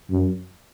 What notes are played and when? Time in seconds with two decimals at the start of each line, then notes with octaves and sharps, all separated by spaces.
0.11 F#2